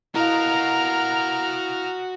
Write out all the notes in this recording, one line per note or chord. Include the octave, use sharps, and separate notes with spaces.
E4 F#4 A#4 D#5 F5 A#5 F6